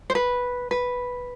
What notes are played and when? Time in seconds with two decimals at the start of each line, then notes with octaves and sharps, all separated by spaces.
0.10 C5
0.15 B4
0.71 B4